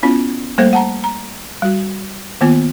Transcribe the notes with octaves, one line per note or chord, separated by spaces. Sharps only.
B3 C#4 E4 F4
G3 A3 A#3 A4 C5
F#5 A5 A#5
A#5
G3 F#4
D#3 A#3 B3 F4